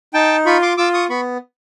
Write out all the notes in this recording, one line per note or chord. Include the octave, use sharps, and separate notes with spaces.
D#4 G5 A5
F4 B5 C#6
C6 D6
F4 D6 E6
C#6 D#6
B3 B5 C#6